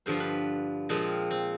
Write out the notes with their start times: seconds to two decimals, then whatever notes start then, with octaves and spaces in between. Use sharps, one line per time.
0.06 G2 D3 F3 C5
0.20 B4
0.89 A#2 F3 G#3 C4
1.31 C4